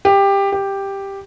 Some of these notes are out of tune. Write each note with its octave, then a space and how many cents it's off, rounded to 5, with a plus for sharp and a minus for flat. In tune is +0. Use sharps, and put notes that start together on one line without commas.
G4 +15
G4 +5